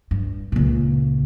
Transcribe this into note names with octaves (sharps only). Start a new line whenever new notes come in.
G2
C#2 A#2